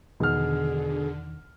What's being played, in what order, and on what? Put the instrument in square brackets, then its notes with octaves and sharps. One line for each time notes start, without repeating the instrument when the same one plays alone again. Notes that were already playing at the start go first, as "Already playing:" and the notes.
[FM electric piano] E2 D#3 [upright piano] B2 F6 [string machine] D3 [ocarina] G#4